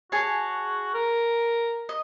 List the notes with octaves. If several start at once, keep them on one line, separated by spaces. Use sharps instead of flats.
F#4 G#4 C#5 A5
A#4
D#5